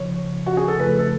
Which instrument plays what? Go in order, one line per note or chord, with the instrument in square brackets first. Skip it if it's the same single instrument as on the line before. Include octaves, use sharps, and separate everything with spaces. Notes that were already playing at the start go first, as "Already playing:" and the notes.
Already playing: [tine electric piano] D2 C#3 F3 [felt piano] C#5
[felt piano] F#4
G#4
A4
[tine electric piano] F#2 C#3 F3 A3 F4 [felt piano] B4
[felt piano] A4